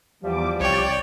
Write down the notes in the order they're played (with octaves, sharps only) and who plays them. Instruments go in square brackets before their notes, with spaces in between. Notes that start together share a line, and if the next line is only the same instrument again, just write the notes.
[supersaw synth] E2 D6 [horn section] F3 G3
[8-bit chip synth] C2 G5 [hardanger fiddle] C#5 [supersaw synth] D5